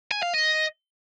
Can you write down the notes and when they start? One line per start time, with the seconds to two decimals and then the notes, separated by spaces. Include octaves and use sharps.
0.11 G#5
0.22 F5
0.34 D#5